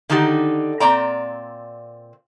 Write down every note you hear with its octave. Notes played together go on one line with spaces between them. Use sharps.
D3 D#3 D#4 F#4 G4
A#2 C4 D5 A#5